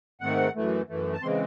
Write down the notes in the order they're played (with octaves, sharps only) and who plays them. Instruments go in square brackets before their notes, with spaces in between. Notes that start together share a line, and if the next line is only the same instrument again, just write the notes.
[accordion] G#2 D#3 A3 C4 F#5
F#2 E3 A3
F#2 E3 A3
A5
C#3 E3 G#3 C4 C6